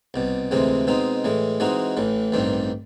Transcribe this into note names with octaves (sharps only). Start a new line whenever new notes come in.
C2 B2 G3
D2 C3 E3 G#3 C4
B2 G#3 C4 D#4
A2 E3 G#3
E3 G#3 C4 D#4 F#4
A1 A2 E3
A1 G2 D#3 G3 C4